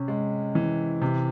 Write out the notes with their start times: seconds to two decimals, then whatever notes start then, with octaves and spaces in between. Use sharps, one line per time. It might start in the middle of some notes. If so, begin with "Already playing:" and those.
Already playing: C3 C#4
0.08 G#3
0.55 E3
1.01 C3